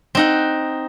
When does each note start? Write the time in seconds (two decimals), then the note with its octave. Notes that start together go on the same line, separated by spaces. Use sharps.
0.15 C4 D#4 F#5